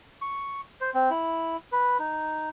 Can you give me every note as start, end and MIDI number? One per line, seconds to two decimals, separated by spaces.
0.22 0.61 85
0.81 0.90 72
0.94 1.10 60
1.10 1.57 64
1.72 1.98 71
1.99 2.49 63